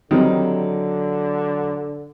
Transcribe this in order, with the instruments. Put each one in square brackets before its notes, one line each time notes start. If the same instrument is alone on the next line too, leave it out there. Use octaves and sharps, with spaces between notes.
[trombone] D3 [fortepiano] D#3 G3 C4 [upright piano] F#3